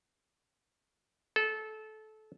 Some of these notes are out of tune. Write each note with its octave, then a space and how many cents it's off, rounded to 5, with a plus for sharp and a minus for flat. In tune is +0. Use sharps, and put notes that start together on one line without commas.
A4 -20